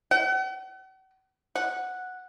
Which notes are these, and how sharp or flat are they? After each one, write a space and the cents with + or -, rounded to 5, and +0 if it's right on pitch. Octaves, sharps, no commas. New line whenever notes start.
F#5 +40
F#5 -5